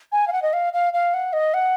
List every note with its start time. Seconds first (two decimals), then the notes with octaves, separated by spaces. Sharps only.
0.12 G#5
0.28 F5
0.32 F#5
0.42 D#5
0.53 F5
0.73 F5
0.93 F5
1.14 F#5
1.33 D#5
1.54 F#5